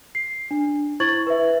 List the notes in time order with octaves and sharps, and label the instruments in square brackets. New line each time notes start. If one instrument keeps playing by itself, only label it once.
[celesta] C7
D4
E4 C5 C#6 G#6 A6 F#7
B4 E5